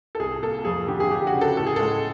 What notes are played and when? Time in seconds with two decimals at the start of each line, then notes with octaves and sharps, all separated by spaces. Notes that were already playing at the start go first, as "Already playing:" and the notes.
0.15 A4
0.19 C2 G#4
0.43 A#3 A4
0.65 F2 G#4
0.88 D3 G4
1.00 G#4
1.11 D4 G4
1.27 F#4
1.34 C#3
1.41 A4
1.57 A2 A4
1.67 G#4
1.76 G#3 A4